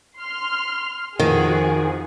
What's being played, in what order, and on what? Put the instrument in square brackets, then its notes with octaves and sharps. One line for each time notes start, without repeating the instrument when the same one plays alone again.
[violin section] C6 F6
[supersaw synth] F2 F3 [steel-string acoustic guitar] D#3 [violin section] F#4 G#4